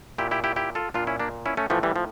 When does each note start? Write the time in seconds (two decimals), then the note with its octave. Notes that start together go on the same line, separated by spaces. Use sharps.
0.18 A#2 E4 G4
0.31 E4 G4
0.44 E4 G4
0.56 E4 G4
0.75 F4 A4
0.94 A#2 D4 F4
1.07 C#4 E4
1.20 A#3 D4
1.46 C#4 E4
1.57 A3 C#4
1.70 A2 E3 F3 A3
1.83 E3 G3
1.96 F3